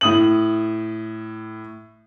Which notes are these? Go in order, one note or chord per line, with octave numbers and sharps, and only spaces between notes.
A2 D#6 F#7